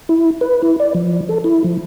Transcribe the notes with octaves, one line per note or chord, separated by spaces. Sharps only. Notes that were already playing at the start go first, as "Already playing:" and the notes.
E4
B4
E4
D5
F3
A4
E4
F3